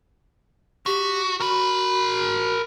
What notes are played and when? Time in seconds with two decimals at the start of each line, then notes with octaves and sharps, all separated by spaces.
0.86 F#4 G4
1.40 F#4 A#4 B5